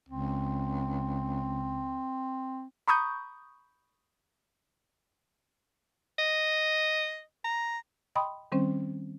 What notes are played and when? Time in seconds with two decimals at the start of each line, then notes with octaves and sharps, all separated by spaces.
0.09 C#2 C4
2.88 A#5 B5 C#6 D#6 G6
6.19 D#5
7.45 A#5
8.15 D#5 G5 B5 C6 D#6
8.52 D#3 G3 C4 C#4 C5